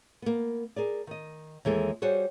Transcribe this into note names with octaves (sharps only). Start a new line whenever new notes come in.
A#3 B3
G#4 A#4 D5
D#3 D#5
D#2 E3 G#3 A4
G3 F#4 G#4 C5 C#5